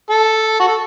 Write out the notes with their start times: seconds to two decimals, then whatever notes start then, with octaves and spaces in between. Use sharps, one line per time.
0.10 A4
0.60 F#4
0.67 A4